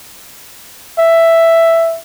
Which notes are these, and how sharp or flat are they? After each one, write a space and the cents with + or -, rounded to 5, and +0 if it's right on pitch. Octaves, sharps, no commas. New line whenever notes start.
E5 +5